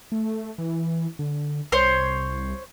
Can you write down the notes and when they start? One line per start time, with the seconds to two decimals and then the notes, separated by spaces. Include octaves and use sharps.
0.12 A3
0.58 E3
1.19 D3
1.72 C2 C5 C#5